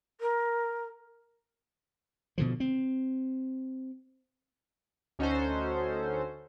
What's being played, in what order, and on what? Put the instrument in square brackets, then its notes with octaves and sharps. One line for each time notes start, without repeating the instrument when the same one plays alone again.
[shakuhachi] A#4
[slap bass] B2 D3 F3
C4
[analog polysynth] D2 C#4 D#4 F#4 A4 C5